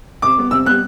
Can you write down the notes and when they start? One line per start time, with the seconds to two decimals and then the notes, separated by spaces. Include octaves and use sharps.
0.22 C3 D6
0.37 G3 B3
0.51 C3 E6
0.66 G3 B3 F#6